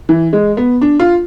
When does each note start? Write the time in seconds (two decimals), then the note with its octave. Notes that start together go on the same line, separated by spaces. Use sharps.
0.09 E3
0.33 G#3
0.57 B3
0.82 D4
1.00 F4